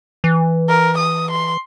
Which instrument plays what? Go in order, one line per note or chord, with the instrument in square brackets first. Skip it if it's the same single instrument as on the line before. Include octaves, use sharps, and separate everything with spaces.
[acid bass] E3
[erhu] A#4
D#6
C6